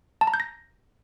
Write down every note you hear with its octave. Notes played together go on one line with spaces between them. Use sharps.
A5
A#5
G6
A#6